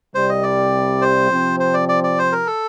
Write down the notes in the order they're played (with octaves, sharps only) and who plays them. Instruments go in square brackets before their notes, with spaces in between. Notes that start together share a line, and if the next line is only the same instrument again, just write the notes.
[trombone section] C2 C3 G3 [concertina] C5
[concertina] D#5
D5
C5
[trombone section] C3 F3 C4
[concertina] C5
D5
D5
D5
C5
A#4
A4